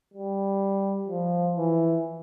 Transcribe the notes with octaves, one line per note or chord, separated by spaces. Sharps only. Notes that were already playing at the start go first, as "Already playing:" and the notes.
G3
F3
E3